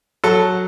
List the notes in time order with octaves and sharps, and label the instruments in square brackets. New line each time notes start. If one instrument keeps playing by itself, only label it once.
[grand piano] F#3 A4